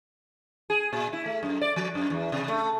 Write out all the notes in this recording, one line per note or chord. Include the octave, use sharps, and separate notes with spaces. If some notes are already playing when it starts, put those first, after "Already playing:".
G#4
A#2
E4
A3
F#2
D5
F3
F#2
E2
C3
A3